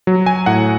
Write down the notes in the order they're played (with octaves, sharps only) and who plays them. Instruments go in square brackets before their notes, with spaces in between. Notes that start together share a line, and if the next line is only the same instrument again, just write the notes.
[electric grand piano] F#3
G#5
A2 F#5